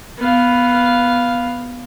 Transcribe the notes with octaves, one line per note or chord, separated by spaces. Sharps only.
B3 F5